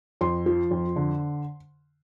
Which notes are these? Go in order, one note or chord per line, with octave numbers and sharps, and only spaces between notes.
F2 C6
F3
F2
D3